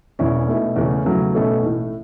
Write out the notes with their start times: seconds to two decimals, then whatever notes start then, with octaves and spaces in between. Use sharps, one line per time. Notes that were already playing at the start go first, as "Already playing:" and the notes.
0.19 E1 E2 E3 C#4 E4
0.48 B2 A3 E4
0.76 E2 C#3 A3 C#4
1.05 E2 C#3 F#3 A3
1.34 B2 A3 C#4 A4
1.63 A1 A2 A3